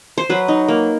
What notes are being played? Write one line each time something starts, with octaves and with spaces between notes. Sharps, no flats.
C5
F#3 B4
D#4
A#3